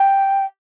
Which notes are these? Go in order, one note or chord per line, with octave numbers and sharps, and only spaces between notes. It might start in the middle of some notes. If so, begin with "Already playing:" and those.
Already playing: G5